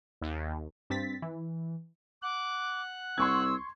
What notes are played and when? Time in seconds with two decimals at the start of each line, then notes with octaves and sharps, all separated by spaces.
0.21 D#2
0.90 G2 C4 A6 B6
1.22 E3
2.23 F#5 D6 F#6
3.18 C2 C6 C#6 E6 G#6